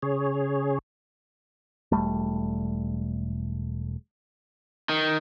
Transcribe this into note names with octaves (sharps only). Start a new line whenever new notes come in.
C#3 G#4 C#5
E1 E2 G3 A3
D#3